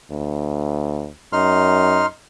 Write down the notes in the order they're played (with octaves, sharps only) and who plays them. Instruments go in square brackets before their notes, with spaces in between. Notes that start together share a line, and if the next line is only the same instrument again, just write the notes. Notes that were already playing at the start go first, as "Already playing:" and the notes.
[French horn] D2
[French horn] F#2 [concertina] D#4 C6 F6